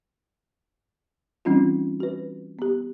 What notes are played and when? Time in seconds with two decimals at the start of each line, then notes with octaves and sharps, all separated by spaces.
1.45 E3 G3 C4 C#4 D#4 F4
2.00 F#4 B4
2.59 B3 G4